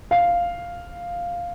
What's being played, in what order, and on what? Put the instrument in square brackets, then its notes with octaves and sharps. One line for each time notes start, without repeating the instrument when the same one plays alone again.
[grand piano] F5